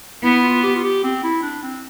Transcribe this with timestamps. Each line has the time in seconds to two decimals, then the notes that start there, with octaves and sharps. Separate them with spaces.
0.23 B3 E4
0.43 F4
0.63 G4
0.76 F4
0.84 G4
1.03 C4
1.24 E4
1.43 D4
1.63 C4